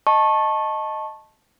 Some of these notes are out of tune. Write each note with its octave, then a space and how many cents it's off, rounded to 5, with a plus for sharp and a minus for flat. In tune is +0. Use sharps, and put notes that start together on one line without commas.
D#5 +0 A5 -5 C#6 -20